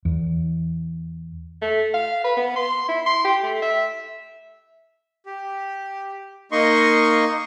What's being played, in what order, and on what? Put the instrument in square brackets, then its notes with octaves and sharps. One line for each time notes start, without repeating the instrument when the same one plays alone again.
[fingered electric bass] E2
[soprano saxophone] A3
F5
B4
B3
C6
E4
C6
G4
A3
E5
[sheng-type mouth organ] G4
A#3 D#4 D#5 C6 C#6